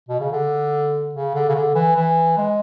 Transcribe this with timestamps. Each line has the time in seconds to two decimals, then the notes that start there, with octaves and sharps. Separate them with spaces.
0.09 B2
0.20 C#3
0.32 D3
1.15 C#3
1.34 D3
1.49 C#3
1.55 D3
1.75 E3
1.96 E3
2.37 G#3